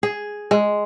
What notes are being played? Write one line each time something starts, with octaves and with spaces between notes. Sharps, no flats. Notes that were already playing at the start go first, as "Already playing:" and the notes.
G#4
G#3